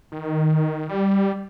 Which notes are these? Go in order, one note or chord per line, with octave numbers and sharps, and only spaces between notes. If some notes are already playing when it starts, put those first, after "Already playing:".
D#3
G3